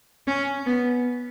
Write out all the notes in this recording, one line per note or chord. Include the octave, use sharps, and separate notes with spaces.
C#4
B3